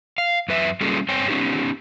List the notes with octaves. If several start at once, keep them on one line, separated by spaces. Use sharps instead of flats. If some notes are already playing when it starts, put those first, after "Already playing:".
F5
F#2 B4 E5
G3 A#3 C#4 F4 G#4 A4
G2 C4 C#5 G5 G#5
B3 C#4 D#4 G4